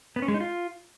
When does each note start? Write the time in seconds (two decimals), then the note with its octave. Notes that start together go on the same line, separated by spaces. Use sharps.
0.16 B3
0.22 C#4
0.28 G#3
0.34 D#4
0.40 F4